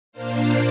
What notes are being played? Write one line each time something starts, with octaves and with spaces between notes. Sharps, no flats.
A#2 A#3 D4 C5 F5